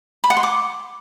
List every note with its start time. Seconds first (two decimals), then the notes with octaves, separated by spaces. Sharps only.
0.24 B5
0.30 F#5
0.37 C6
0.43 D6